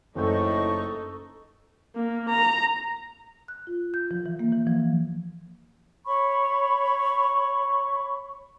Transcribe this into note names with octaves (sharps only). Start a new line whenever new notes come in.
F#1 A2 D#4 A4 D#5 C#6 G6
A#3
A#5
F#6
F4
G6
F3
E3
A#3
E3
F3
C#5 B5 C#6